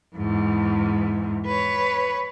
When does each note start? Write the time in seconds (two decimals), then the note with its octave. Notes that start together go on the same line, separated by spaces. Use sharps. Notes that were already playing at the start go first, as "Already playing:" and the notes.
0.15 E2 G#2
1.46 B4 C#5